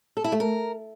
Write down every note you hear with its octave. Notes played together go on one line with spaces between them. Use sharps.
A4
E4
A3
A#4